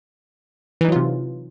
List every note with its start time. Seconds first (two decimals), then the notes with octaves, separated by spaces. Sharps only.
0.81 E3
0.85 D#4
0.88 F#3
0.92 F4
0.96 C3